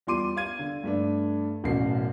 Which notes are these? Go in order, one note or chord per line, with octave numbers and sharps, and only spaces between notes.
E2 G3 F4 C6 D6 D#7
F5 G#6 D#7
D3
G2 A3 D4
E1 A1 F#2 F#4 C7